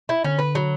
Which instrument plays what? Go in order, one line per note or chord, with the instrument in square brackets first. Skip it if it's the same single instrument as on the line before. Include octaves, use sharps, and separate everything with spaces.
[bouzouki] E4
[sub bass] D3 [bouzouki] C#4
[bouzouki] B4
F#3